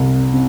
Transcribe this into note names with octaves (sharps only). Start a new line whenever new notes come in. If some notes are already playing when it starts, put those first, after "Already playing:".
Already playing: C2
C3